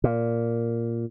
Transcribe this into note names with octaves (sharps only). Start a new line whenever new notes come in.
A#2